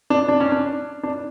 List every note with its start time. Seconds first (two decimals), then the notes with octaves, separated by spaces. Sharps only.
0.10 D4
0.28 D4
0.40 C#4
0.52 D4
1.03 D4